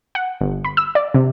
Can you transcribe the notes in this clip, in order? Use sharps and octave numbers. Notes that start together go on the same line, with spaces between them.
F#5
G1
B5
E6
D5
C3